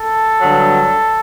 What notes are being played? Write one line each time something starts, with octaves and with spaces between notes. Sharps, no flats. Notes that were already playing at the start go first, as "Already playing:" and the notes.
Already playing: A4
G2 D3 F#3